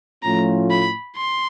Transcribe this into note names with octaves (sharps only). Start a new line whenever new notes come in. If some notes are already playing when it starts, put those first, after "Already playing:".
A2 F3 A3 C#4 F4 A#5
B5
C6